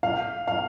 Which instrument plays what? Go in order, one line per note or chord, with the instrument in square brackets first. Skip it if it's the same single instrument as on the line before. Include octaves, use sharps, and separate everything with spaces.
[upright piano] F5
F5